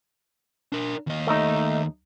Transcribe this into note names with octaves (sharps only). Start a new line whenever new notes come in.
D4 A#4
D#2 D#5
A3 D#4